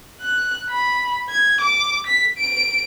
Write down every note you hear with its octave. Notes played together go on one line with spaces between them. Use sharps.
F#6
B5
G#6
D6
B6
D7